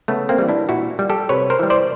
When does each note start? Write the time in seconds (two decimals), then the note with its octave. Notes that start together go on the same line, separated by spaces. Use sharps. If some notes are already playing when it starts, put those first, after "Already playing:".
0.08 C#3 A3 B3
0.29 A#3 C4
0.38 E3 G3
0.49 D4 E4
0.69 A#2 E4 F#4
0.99 G3
1.10 G4 A4
1.29 C3 B4 C#5
1.50 A#4 C5
1.59 E3 G3
1.70 C5 D5